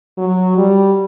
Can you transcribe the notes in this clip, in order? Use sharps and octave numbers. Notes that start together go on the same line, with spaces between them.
F#3
G3